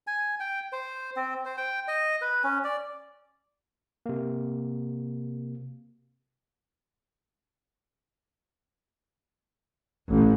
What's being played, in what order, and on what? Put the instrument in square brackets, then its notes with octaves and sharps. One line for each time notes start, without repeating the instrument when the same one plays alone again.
[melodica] G#5
G5
C5
C4
C5
G5
D#5
B4
C#4
D5
[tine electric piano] C3 A#3
[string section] A1